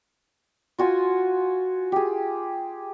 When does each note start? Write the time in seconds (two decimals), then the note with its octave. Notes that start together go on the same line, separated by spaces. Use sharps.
0.78 F4 F#4 G#5
1.92 G4 G#4